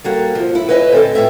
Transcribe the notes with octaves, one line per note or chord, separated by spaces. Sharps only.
G3 A#3 F#4 A4
C3 F3
E4
B4 C#5 D#5 E5 G#5
D3 C4 A4
A2 C#4 E5 G5